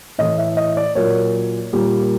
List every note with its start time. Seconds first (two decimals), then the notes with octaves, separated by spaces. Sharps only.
0.18 A2 E3 A3 D#5
0.38 E5
0.57 D#5
0.77 D5
0.95 A#2 F#3 A#3 C#5
1.73 A#2 G3 A#3